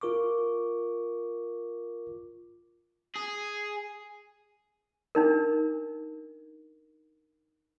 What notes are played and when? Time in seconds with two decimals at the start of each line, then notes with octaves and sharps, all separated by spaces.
0.01 F4 A#4 C#6 D6
3.15 G#4
5.15 D4 D#4 A#4